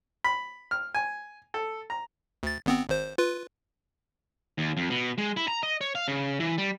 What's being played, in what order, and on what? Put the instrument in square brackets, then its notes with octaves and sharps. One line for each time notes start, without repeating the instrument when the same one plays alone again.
[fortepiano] B5
F6
G#5
A4
A#5
[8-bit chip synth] D2 A6
G#1 B3 C4
G#1 C5
F4 B4
[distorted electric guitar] D#2
F2
B2
G#3
E4
A#5
D#5
C#5
F5
C#3
E3
G3